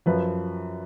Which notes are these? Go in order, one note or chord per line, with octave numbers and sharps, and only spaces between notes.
F#2 F3 B4